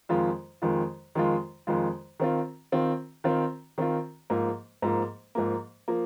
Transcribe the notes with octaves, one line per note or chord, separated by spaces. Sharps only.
F2 D#3 G#3 F4
F2 D#3 G#3 F4
F2 D#3 G#3 F4
F2 D#3 G#3 F4
D#3 C4 F4
D#3 C4 F4
D#3 C4 F4
D#3 C4 F4
G#2 F3 A#3
G#2 F3 A#3
G#2 F3 A#3
F3 A#3